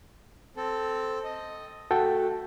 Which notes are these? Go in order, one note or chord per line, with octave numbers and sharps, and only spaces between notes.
C4 A4
D#5
A3 F#4 A4 G5